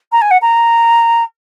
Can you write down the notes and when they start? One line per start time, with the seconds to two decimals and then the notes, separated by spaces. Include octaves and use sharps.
0.12 A#5
0.21 G#5
0.31 F#5
0.41 A#5